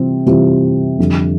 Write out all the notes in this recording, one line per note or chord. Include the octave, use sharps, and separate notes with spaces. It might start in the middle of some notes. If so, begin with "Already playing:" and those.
Already playing: C3 E3 G3 C4 F4
C3 E3 G3 C4 F4
F2 D3 G3